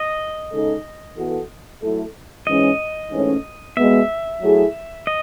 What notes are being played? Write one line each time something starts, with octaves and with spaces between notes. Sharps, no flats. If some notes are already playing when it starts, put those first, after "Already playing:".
Already playing: D#5
C#3 G#3 D#4 A4
E3 B3 F#4 A4
F#3 A3 E4 A4
G#2 E3 G#3 C#4 D#5
G#2 E3 A3 C#4
B2 G#3 B3 E5
F#3 A3 E4 G#4
D#5